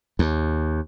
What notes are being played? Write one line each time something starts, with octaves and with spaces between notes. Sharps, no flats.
D#2